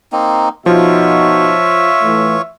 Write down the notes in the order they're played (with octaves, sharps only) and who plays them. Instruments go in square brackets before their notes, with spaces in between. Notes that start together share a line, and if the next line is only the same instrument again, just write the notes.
[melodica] A#3 C4 D#4
[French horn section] B2 D#4 F#4 [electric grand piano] F3 [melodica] F4 C#5 C#6 [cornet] E5
[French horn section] A2 E3 A3